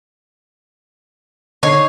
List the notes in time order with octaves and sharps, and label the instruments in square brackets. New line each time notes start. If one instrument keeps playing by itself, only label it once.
[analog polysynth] D3 C7 [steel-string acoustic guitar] D#4 [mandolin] C#5